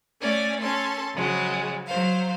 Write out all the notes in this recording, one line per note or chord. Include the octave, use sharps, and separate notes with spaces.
A3 C#4 D5 G#5
C#4 A4 C6
C#3 F3 F#3 G#3 F#4
F#3 C5 F5